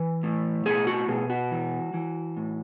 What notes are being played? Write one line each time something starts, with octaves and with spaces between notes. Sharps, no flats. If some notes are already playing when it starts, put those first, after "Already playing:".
Already playing: E3
A2
B2 G#4
F#4
B2 G#4
F#4
E3
E3
A2